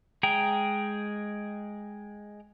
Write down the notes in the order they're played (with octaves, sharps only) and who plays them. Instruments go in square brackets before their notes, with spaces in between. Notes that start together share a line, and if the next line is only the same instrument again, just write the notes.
[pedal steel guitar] G#3 G#4 G5 A#5